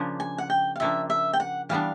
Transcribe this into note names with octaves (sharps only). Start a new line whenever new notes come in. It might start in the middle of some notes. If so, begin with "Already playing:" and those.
Already playing: C#3 F3 A#3 D4
G#5
F#5
G5
F5
C#3 F3 A#3 D4 E5
E5
G5
F#5
E3 G3 B3 D4 F5